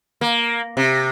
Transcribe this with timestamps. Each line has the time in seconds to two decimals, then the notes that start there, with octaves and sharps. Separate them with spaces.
0.21 A#3
0.77 C3